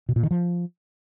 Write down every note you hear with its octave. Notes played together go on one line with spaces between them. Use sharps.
B2
A#2
D#3
F3